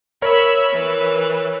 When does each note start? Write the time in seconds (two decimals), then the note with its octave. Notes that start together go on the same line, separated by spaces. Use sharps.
0.22 A#4 C#5 E5 B5
0.73 E3 B4